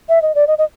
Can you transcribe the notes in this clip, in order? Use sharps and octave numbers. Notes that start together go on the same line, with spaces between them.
E5
D#5
D5
D#5
D#5